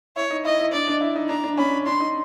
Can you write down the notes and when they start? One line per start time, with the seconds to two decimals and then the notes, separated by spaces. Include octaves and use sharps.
0.16 E4 C#5
0.30 D#4
0.45 E4 D#5
0.59 E4
0.73 D4 D5
0.87 D4
1.01 E4
1.16 D#4
1.29 D4 A#5
1.44 D4
1.58 C#4 B5
1.86 D4 C6
2.00 D#4